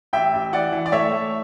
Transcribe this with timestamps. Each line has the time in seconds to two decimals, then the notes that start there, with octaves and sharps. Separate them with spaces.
0.13 A1 E5 G5
0.33 A1
0.52 E3 D5 F#5
0.72 E3
0.86 D5
0.92 A3 C#5 E5
1.12 A3